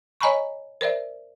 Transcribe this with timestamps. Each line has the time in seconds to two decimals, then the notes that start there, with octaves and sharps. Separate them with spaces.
0.21 C#5 D#5 G#5 A#5 B5 C#6
0.81 A#4 C5 D5 E5